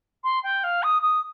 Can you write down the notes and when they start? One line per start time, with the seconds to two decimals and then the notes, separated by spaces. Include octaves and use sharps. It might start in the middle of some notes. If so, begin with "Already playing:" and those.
0.24 C6
0.43 G5
0.64 F5
0.83 D#6
1.02 D#6